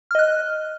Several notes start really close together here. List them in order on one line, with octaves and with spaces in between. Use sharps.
F6 D#5 F#6